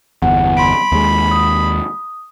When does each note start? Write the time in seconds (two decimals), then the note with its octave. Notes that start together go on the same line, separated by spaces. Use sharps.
0.22 G1 E2 F#5
0.57 B5 C6 D7
0.92 D#2 G#3
1.31 D#6